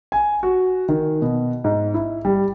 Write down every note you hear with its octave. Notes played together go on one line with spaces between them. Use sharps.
G#5
F#4
D#3
B2
G#2
E4
G3